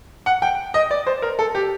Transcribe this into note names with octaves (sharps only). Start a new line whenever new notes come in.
F#5
G5
D#5
D5
C5
A#4
A4
G4